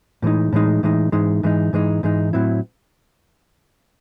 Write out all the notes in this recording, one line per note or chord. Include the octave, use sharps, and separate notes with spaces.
A2 E3 G#3 D#4
A2 E3 G#3 D#4
A2 E3 G#3 D#4
G#2 E3 G#3 D#4
G#2 E3 G#3 D#4
G#2 E3 G#3 D#4
G#2 E3 G#3 D#4
A2 F#3 C4 E4